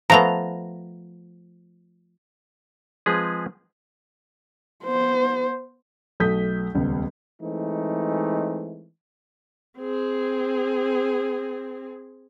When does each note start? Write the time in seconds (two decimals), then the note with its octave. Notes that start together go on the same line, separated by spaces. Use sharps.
0.10 F3 A3 B3 A#5
3.06 F3 G#3 C4 G#4 B4
4.84 B3 C5
6.20 B1 A3 A4 D#6 G6 B6
6.75 D#1 C#2 B3
7.41 E3 G#3 A3 C4 D#4
9.78 C4 G#4